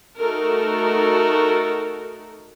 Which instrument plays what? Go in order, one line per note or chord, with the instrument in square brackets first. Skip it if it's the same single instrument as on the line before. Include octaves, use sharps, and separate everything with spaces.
[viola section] A3 D#4 F#4 A4 A#4